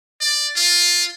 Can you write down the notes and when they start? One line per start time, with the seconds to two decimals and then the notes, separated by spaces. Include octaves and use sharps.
0.21 D5
0.56 F4